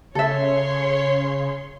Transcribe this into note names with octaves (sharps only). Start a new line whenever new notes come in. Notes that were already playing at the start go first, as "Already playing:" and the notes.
C#3 A4 C#5 E5 C6